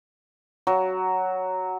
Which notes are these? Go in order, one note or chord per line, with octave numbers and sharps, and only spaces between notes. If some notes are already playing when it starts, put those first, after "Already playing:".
F#3